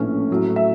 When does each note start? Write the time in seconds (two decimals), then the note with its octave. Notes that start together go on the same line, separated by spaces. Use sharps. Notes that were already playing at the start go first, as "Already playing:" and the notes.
Already playing: A#1 A2 E3 A3 C#4
0.30 A2 F#3 A3
0.56 E5